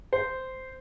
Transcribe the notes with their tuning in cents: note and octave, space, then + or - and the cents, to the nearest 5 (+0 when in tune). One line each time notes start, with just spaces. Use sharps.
C5 -10